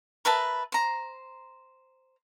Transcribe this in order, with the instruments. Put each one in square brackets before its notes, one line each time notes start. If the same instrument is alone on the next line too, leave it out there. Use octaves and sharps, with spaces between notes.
[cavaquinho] A#4 B4 E5 A5
C5 A#5